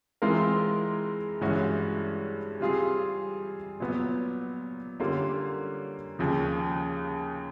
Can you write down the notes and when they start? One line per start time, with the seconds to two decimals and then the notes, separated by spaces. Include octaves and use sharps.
0.22 E3 G#3 C4 F4 A#4
1.41 G2 E3 G#3 C#4 F#4
2.61 G3 C4 F4 G#4
3.80 A#2 F#3 B3
5.00 D3 G3 A#3 C#4 F4
6.19 D#2 C#3 F3